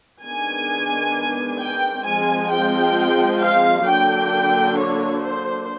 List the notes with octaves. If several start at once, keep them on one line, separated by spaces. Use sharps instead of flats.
D#3 G#3 B3 D4 G#5
G5
F3 G#3 C4 G#5
G5
F5
D3 F#3 A#3 D4 G5
C#5
C5